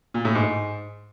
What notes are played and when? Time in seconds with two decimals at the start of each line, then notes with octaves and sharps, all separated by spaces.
0.14 A#2
0.25 A2
0.35 G#2